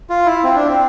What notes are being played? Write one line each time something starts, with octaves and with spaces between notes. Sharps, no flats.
F4
E4
C4
D4
C4